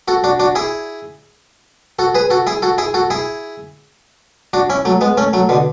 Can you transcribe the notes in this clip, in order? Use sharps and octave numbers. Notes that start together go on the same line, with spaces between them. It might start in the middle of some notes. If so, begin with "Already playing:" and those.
F#4 A4
D4 F#4
D4 F#4
E4 G#4
F#4 A4
G#4 B4
F#4 A4
E4 G#4
F#4 A4
E4 G#4
F#4 A4
E4 G#4
D4 F#4
C#4 E4
F#3 A3
G#3 B3
A3 C#4
F#3 A3
B2 D3